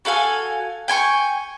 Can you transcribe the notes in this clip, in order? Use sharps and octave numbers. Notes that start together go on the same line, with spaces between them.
F#4 A4 F5 G#5
G5 G#5 C6 C#6